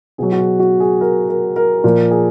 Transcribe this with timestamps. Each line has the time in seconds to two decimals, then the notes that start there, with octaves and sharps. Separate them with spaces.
0.18 B2 F#3 G#4
0.32 F#4
0.39 G#4
0.59 F#4
0.80 G#4
1.01 A#4
1.29 A#4
1.56 A#4
1.84 A#2 F3 A#4
2.11 G#4